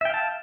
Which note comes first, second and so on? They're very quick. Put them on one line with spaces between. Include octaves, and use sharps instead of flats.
E5 G5 F5 A5